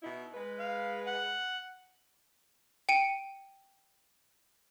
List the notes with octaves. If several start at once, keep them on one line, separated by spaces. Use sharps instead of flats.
B2 D#4 E4
G#3 B4
F5
F#5
G5 C#7 D#7